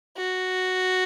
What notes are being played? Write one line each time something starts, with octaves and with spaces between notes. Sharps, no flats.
F#4